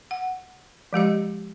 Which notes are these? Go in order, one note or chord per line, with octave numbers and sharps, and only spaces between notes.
F#5
F3 G#3 G4 D#5